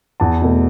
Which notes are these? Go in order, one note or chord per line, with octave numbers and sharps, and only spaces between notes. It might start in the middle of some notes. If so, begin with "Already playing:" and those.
E2 A5
B2 A3